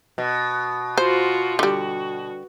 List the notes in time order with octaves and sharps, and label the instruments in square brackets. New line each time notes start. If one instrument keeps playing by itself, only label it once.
[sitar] B2
[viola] F4 F#4 [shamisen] C5
[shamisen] D3 G3 [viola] F#4